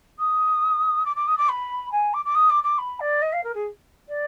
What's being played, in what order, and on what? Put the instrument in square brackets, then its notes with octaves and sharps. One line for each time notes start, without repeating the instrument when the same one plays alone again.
[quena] D#6
D6
D6
D#6
D6
B5
G#5
D6
D6
D#6
D6
D6
B5
D5
D#5
F5
A#4
G#4
D5